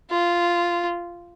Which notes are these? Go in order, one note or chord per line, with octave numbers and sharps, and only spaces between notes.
F4